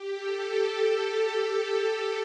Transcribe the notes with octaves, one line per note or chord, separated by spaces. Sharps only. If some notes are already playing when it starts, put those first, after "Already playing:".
Already playing: G4
A4